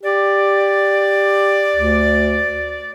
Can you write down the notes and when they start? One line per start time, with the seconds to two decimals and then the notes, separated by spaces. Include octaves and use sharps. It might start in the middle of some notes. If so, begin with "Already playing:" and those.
0.03 G4 D5
1.76 D2